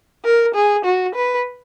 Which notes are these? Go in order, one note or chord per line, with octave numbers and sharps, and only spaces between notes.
A#4
G#4
F#4
B4